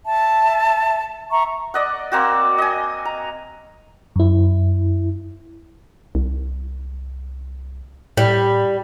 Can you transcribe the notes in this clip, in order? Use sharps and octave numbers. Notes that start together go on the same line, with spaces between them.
E5 A5
E5 A#5 C#6
D5 D#5 F#5
A#3 C4 F#4
D#5 G#5
A#5
F#2 E4
C2
A2 G3